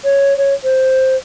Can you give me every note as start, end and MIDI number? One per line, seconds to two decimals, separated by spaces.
0.04 0.34 73
0.37 0.54 73
0.63 1.15 72